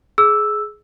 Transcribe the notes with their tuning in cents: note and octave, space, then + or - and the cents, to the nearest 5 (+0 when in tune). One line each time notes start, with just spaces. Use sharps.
G#4 +15 E6 +0